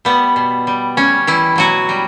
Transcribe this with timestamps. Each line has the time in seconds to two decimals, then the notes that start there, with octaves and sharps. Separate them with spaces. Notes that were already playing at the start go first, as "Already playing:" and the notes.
0.05 G3 B3
0.36 B2
0.67 G3
0.97 G3 C#4
1.27 E3 G3 E4
1.56 B2 F#3 F#4
1.89 G3